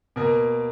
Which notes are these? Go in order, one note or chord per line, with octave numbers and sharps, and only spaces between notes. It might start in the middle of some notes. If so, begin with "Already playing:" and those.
B2 A#3 A#4